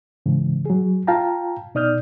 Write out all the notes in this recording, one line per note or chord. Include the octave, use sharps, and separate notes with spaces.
G#2 C#3 E3
F#3 G#4
F4 F5 G5 A5 A#5
B2 D#4 D5 D#6 F6 G6